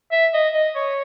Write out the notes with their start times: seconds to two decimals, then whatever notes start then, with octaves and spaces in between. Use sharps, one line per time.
0.12 E5
0.34 D#5
0.54 D#5
0.76 C#5